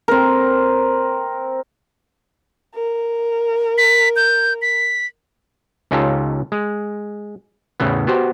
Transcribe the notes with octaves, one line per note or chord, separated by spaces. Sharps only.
C4 A#4
A#4
B6
G6
B6
C#2 C#4 D#4 F4 G4 A4
G#3
E2 A2 C#3 E3 B3
B3 F#4 G4 C5